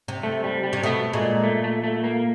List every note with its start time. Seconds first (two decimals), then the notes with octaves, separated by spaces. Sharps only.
0.08 C3
0.23 A3
0.44 G3
0.63 G3
0.73 C3
0.83 B2 A3
1.13 A#2 G#3
1.44 A3
1.64 A3
1.83 A3
2.04 A#3